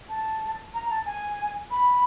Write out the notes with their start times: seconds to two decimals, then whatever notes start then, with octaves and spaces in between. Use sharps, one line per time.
0.09 A5
0.74 A#5
0.90 A5
1.06 G#5
1.71 B5